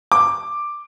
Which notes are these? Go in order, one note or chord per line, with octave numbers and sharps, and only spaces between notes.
D6